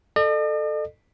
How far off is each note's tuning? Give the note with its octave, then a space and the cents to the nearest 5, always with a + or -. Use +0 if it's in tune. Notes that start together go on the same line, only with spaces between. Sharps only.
A4 +0 D#5 -45